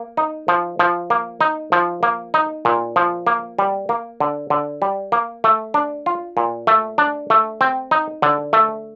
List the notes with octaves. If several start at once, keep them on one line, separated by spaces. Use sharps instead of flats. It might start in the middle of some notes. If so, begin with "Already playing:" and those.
Already playing: A#3
D#4
F3
F3
A#3
D#4
F3
A#3
D#4
A#2
F3
A#3
G3
A#3
D3
D3
G3
A#3
A3
D4
F4
A#2
A3
D4
A3
C4
D#4
D3
A3